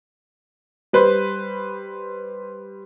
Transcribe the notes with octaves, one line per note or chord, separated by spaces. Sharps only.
G3 B4 C5